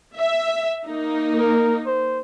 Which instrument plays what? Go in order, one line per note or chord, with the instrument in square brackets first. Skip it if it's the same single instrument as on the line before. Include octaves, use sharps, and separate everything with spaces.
[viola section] E5
A#3 D#4
[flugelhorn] A#4
C5